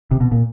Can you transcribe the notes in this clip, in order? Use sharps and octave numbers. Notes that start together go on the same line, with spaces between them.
C3
B2
A#2